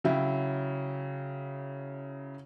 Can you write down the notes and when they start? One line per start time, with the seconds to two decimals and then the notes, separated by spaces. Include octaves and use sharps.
0.04 C#3 F#3 E4 G5